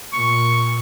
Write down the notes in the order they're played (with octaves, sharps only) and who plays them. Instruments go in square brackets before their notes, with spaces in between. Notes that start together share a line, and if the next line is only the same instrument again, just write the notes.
[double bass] A#2 [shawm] C#6